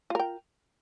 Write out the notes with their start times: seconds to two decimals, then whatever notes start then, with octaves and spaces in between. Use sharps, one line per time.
0.10 F4
0.15 A#4
0.20 G5